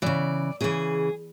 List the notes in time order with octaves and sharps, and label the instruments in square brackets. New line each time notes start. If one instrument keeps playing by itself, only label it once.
[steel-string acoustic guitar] C#3 E3 D5
C#3 E3 G#4